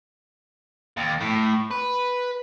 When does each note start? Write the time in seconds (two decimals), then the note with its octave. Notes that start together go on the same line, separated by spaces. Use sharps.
0.97 D#2
1.21 A2
1.71 B4